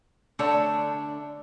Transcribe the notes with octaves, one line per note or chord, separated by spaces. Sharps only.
D3 A3 D4 C#5